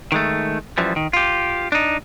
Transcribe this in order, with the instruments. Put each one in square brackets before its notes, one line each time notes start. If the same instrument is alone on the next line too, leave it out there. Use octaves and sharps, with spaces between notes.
[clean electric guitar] D#3 G#3 A3
F#2 E3 F3 G3
D#3
F4 G4
D4 D#4